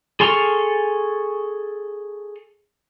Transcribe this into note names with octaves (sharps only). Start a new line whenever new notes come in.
G#4 A4 C6 C#6 F6